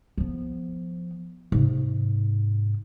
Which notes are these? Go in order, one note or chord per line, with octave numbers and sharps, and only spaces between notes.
F3 B3
G#2 C3